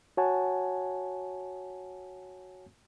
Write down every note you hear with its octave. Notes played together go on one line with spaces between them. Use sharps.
F#4 C#5 F#5 G#5 A5